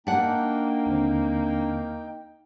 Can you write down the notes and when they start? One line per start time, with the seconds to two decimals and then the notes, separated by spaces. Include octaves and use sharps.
0.07 A#3 D4 D#4 F#5 G5
0.86 D#2 D3 C4